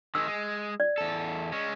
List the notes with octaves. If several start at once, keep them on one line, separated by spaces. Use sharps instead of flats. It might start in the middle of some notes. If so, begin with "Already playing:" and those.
D#3 G#3 E6
G#3
D5
E2 A4
G#3 C#4